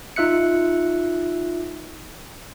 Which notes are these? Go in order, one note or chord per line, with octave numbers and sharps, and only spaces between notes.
D#4 F4 E5 F#6 C#7